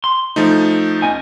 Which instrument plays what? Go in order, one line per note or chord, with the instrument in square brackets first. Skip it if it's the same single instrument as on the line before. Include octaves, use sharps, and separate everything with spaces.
[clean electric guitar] C6
[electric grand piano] F3 A3 D#4
[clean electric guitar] C#4 D#5 G#5